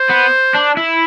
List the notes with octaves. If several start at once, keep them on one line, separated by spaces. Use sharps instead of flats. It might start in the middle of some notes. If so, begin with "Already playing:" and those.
Already playing: C5
B3
D4
E4